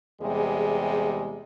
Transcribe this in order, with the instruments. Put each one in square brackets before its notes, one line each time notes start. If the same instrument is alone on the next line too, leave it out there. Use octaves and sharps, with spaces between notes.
[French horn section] E2 C3 G3 G#3 G#4